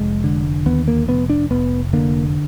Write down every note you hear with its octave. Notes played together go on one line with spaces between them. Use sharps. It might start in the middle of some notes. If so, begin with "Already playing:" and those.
Already playing: F1 G#3
D3
D#2 B3
A#3
F1 B3
D4
F1 B3
D3 A#3